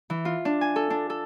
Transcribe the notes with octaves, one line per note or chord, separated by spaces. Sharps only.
E3
F4
D4
G#5
A4
D4
A4